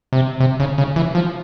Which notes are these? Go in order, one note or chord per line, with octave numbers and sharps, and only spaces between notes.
C3
C3
C#3
C#3
E3
F3